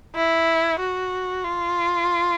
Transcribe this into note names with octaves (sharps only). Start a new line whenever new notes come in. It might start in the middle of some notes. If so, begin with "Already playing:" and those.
E4
F#4
F4